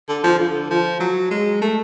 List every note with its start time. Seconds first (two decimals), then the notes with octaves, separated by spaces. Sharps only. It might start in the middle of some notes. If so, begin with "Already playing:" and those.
0.08 D3
0.23 F3
0.40 D3
0.70 F3
1.00 F#3
1.31 G#3
1.61 A3